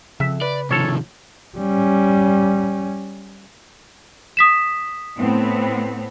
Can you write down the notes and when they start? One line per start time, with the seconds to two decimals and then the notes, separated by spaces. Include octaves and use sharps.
0.20 F2 C#3 E5
0.42 B4 D5
0.71 A2 C3 D#3 F3 A4 C#5
1.57 G3 C#4
4.37 D#6 B6 E7
5.18 A2 B3 C4